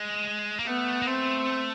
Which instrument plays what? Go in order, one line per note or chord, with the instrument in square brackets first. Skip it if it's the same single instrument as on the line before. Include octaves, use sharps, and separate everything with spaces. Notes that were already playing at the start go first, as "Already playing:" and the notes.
Already playing: [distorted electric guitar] G#3
A#3
[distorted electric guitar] A3 [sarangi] B3
[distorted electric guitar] A#3
[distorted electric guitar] A3 [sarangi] C4